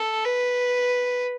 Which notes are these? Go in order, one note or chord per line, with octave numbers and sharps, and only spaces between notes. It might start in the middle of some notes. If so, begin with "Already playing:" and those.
Already playing: A4
B4